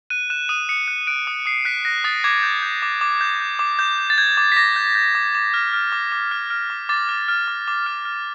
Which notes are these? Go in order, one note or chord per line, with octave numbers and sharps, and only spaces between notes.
F#6 D#7
F#6 E7
D#6 D#7
D#6 C#7
F#6
F#6 D7
D#6
D#6 C7
F#6 B6
F#6 A#6
D#6 A6
D6 G#6
G6
G6
D6
D6
G6
G6
D6
D6 G6
G6
A6
G6 G#6
D6
B6
D6 A#6
G6
G6
D6
D6
F6
F6
D6
D6
F6
F6
D6
D6 A6
F6
F6
D6
D6
F6
F6